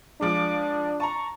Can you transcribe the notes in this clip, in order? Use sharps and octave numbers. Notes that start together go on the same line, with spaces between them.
F3 G#3 D4 D6
A5 A#5 C#6